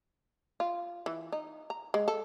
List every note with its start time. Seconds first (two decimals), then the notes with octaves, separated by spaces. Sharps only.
0.60 F4
1.06 E3
1.32 D#4
1.70 A#5
1.94 G#3
2.08 A4